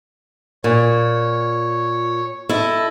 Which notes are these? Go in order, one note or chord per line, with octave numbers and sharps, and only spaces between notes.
A#2 C#5
E4 A4 D#5